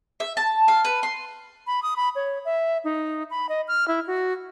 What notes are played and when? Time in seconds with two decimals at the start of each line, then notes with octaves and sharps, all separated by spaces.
0.20 E5
0.37 A5
0.68 F5
0.85 B4
1.03 C6
1.67 B5
1.83 D#6
1.96 B5
2.15 C#5
2.45 E5
2.84 D#4
3.30 B5
3.49 D#5
3.68 F6
3.88 E4
4.07 F#4